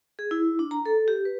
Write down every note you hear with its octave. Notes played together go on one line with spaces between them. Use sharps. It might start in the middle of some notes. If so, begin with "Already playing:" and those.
G#4
E4
D4
A#5
A4
G4
B4